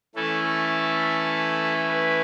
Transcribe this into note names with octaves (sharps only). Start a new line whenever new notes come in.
E3 A3 C#4 E4 A4
A4
B4